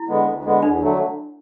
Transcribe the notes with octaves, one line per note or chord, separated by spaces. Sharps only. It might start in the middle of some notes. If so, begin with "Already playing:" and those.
Already playing: E4
D3 G#3 B3
D2
D3 G#3 B3
E2 D4
D3 F#3 A3